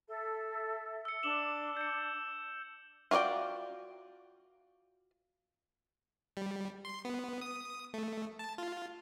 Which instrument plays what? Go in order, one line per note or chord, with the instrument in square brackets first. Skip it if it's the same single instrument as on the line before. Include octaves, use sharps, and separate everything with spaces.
[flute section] A4 E5
[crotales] E6 C#7
[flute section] D4 D6 [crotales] E7 F#7 G7
[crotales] G6 C#7
[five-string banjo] F4 F#4 C#5 D5 G5
[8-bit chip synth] G3
C6
B3
D#6
A3
A5
F4